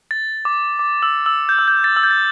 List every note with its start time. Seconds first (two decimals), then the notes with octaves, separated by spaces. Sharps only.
0.11 A6
0.45 D6
0.79 D6
1.03 E6
1.26 E6
1.49 G6
1.59 E6
1.68 G6
1.84 A6
1.96 E6
2.03 G6
2.11 A6